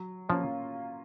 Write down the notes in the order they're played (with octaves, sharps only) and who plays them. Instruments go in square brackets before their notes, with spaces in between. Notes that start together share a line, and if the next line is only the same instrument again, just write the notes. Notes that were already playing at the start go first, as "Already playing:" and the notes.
Already playing: [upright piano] F#3
[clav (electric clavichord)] F3 [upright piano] A#3 C#4 F4